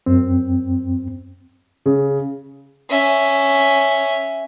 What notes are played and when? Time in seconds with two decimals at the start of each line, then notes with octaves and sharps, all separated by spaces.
0.06 F#2 C4
1.86 C#3
2.90 C#4 E5